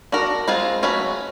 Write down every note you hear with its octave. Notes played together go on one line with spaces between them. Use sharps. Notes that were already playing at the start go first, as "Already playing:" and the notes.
D4 F#4 A#4
G#3 C4 F4 G#4
F#3 A3 C#4 F#4 B4